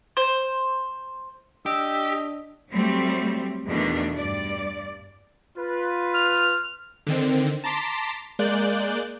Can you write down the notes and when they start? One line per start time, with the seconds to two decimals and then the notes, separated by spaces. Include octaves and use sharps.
0.17 C5
1.66 D4 G4 D#5 E6
2.71 F#3 G3 A3 C4
3.67 E2 B2 D#3 A3 D4
4.16 G2 D5
5.58 F4 B4
6.13 F6
7.07 D3 D#3 C4
7.64 A5 A#5 C6 D6 B6
8.39 G#3 A#3 D5 F#6 G6